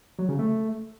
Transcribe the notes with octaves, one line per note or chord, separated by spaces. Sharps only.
F#3
C#3
A3